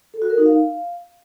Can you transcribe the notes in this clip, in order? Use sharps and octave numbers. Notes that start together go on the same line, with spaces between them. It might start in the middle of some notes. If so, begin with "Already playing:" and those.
A4
F#4
A#4
D#4
F5